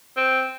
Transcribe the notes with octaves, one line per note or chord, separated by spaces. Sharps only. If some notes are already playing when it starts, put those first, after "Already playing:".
C4